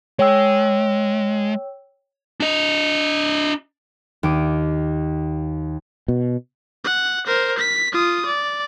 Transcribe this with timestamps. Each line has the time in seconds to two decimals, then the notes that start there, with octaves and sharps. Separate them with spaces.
0.19 G#3 C#5 G5 E6
2.40 D4 D#5
4.23 D#2 D6 D#7
6.08 B2
6.84 F#5
7.27 A#4 C5
7.58 B6
7.92 F4 D#6
8.26 D5